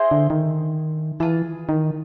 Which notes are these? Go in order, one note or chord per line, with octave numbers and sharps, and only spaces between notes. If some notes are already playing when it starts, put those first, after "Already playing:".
Already playing: E4 G#4 C5 D#5
D3
D#3
E3 D4 F4 G#4
D#3